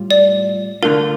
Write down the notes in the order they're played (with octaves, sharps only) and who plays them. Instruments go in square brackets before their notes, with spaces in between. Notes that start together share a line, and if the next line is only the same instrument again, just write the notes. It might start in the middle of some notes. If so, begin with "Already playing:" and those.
Already playing: [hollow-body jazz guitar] A2 G3 F4
[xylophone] D5
[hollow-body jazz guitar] D3 A3 D4 F4 [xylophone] A#4